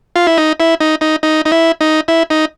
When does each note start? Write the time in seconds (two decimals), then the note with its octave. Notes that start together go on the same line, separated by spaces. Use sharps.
0.16 F4
0.27 E4
0.38 D#4
0.60 E4
0.80 D#4
1.01 D#4
1.23 D#4
1.45 D#4
1.52 E4
1.81 D#4
2.08 E4
2.30 D#4